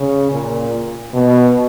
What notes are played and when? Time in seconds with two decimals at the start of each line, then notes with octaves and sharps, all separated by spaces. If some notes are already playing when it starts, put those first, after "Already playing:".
Already playing: C#3
0.32 A#2
1.14 B2